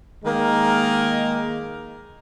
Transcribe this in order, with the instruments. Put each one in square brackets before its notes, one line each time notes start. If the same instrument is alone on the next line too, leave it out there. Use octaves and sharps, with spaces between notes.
[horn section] D#3 G#3 A#3 A#4